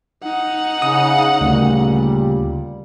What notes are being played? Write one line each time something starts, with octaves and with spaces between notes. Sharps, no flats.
D#4 F#5
C#3 D#6
D2 A#2 C#3 G3